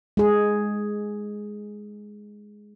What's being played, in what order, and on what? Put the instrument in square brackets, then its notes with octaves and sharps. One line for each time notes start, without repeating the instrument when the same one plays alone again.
[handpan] G#3 G#4